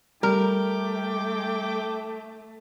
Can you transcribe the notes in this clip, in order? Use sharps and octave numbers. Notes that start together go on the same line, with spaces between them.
G3 A3 A#4 G5 D6